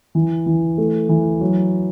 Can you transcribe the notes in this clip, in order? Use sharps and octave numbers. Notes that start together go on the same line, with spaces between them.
E3
E3
A3
E3
F#3